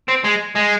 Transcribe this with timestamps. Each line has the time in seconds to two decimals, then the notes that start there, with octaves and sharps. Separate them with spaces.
0.09 C4
0.25 G#3
0.56 G#3